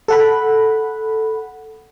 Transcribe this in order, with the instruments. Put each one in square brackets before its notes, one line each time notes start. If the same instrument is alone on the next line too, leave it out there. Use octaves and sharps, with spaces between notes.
[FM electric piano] A4 F#5 B5